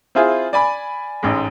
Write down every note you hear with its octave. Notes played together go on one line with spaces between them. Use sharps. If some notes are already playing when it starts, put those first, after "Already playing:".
C4 E4 F4 G#4
D5 G#5 B5
A1 G#2 G#3